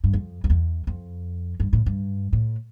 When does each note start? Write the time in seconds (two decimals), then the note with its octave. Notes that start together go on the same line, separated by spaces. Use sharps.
0.04 G2
0.13 F2
0.44 F2
0.50 E2
0.87 F2
1.60 G2
1.73 A2
1.86 G2
2.33 A2